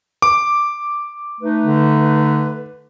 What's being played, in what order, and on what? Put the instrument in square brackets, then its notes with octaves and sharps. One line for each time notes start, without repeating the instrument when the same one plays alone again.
[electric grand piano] D6
[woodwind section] A3 D#4 B4
[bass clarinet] D3